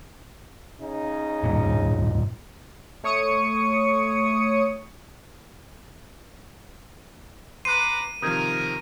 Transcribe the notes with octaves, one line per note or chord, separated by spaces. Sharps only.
C#3 C#4 D#4
D1 G2 A#2
A3 C#5 C#6 D#6 C#7 D#7
B4 A#5 C6 D6 F#6 C7 D#7
C3 D#3 F3 A#4 D#6 G6 G#6